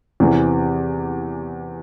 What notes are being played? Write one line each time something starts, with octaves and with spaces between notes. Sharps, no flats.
E2 C3 E3